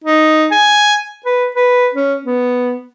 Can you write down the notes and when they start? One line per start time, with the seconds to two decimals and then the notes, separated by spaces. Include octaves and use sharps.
0.04 D#4
0.52 G#5
1.26 B4
1.55 B4
1.94 C#4
2.25 B3